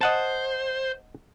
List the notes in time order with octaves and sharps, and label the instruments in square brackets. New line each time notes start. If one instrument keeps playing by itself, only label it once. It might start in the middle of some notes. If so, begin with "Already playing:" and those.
[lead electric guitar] C5 [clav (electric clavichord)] D#5 F#5 A5